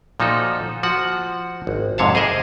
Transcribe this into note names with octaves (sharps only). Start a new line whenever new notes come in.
A#2 F3 D#4 F#4 A4
F3 F#4 F#5
G#1
F2 G#2 C3 C#5 F5 A5
G#4 A#4 C5 D#5 E5